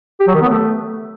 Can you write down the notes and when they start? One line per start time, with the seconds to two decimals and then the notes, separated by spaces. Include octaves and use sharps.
0.20 G4
0.27 F#3
0.34 D#3
0.41 B3
0.49 A3